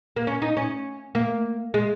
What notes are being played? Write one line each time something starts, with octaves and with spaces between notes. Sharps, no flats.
A#3
C#4
D#4
C#4
A#3
G#3